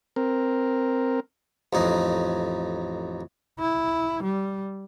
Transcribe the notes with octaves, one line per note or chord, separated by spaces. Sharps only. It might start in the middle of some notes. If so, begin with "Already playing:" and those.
C4 A#4
A1 F2 D#4
E4
G3